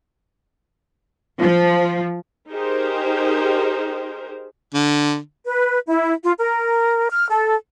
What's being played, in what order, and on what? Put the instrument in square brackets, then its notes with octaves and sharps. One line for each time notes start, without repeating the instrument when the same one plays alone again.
[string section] F3
[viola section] D#4 G4 G#4 A#4 C5
[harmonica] D3
[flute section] B4
E4
F4
A#4
F6
A4